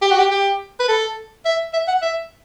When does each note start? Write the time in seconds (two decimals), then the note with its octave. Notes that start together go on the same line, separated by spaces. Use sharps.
0.02 G4
0.11 F#4
0.19 G4
0.31 G4
0.80 B4
0.88 A4
1.45 E5
1.74 E5
1.88 F#5
2.02 E5